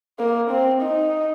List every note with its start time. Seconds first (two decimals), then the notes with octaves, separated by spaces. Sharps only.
0.19 A#3
0.50 C4
0.81 D#4